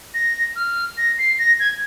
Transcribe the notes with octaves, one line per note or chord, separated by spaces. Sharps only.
A#6
F6
A#6
C7
A#6
G#6